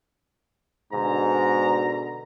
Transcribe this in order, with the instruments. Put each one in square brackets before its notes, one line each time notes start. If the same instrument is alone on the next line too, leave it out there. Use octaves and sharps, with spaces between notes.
[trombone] G#2 [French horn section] B2 D3 [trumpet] A#5